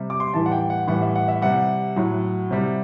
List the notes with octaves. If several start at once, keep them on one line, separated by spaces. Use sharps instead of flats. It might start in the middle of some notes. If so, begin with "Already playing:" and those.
Already playing: C3 G3
D6
C6
A2 E3 G3 A5
F#5
G5
F#5
A2 E3 G3 F#5
E5
F#5
E5
C3 G3 F#5
A2 F#3
C3 G3